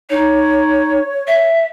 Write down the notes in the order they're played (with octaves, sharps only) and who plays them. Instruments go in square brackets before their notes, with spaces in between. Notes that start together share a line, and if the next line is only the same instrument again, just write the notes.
[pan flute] D#4 [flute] C#5
[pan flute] E5